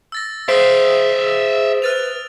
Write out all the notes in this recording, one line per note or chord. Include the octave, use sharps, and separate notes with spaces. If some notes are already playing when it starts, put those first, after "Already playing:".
E6 A6 A#6
G#4 C5 E5 F5 D#6 E6 D7
B4 F6 A6 F7